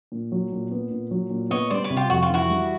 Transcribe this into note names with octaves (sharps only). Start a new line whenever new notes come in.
A#2
F#3
A#2
B3
A#2
F#3
A#2
B3 C#5 D#5
G3 C5 D5
B4 C#5
C3
F4 G4
F2 F#4
F4
E3 E4 F#4
G3